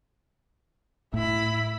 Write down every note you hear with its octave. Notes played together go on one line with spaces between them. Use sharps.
A2 E4 B5